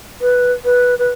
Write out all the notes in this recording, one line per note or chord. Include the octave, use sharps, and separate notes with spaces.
B4
B4
B4